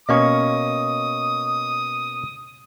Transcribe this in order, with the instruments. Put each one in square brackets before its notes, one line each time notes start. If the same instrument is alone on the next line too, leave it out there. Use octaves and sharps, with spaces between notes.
[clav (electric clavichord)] B2 A#3 C#4 [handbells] D#5 C#6 [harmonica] D#6